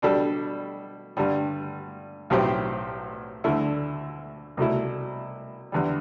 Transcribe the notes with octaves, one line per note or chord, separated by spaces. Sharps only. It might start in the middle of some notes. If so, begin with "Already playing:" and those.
B2 G3 D4 A4
G2 D3 G3
B1 A2 F#3 C4 G4
D2 D3 A3 E4
C2 B2 A3 E4
E2 D3 G3